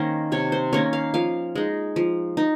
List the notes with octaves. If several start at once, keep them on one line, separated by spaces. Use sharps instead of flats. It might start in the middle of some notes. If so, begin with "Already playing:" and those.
Already playing: D#3 A#3 C#4 C5
C3 C#5
C5
D#3 A#3 C#4 C#5
F5
F3 F5
G#3 D#4
F3
D#4